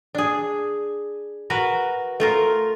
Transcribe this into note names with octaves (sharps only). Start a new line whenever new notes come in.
D4 G#4
F#4 A#4 B4
A3 F4 A#4